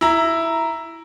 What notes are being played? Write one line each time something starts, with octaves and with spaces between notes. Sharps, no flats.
E4 A#5